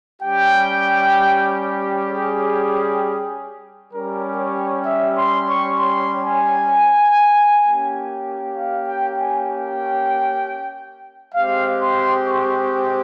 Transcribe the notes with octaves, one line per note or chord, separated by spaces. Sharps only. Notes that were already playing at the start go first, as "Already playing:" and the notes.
G3 C#4 G4 G5
G#4
G3 C#4 G4 A#4
C#5
E5
C6
C#6
C6
G#5
A#3 C#4 G4
F5
G5
G#5
G5
G#3 C4 G4 F5
C6
C#6